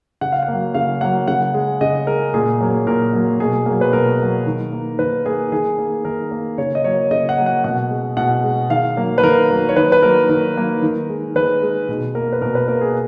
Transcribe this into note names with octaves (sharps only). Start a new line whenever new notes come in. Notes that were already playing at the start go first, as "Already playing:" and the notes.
C#3 F#5
F5
F#5
F#3 A#3
C#3 F5
F#3 A#3 F#5
C#3 F#5
G#3
C#3 D#5
G#3 A#4
A#2 G#4
F#3 A#3
A#2 A#4
F#3 A#3
B2 G#4
F#3 A#3
B4
B2 A#4
F#3 A#3
D#3
A#3
D#3 B4
A#3 G#4
D#3 G#4
A#3
D#3 A#4
A#3
C#3 C#5
D#5
F#3 A#3 C#5
C#3 D#5
F#5
F#3 A#3
F#5
B2 F#5
G#3
B2 F#5
G#3
D#3 F5
F#3 A#3
B4
D#3 A#4
F#3 A#3
C#5
D#3 B4
B4
F#3 A#3 A#4
D#3 A#4
F#3 A#3
D#3
G#3
D#3 B4
G#3
B2
A#3 A#4
B4
B2 A#4
B4
A#3 A#4
G#4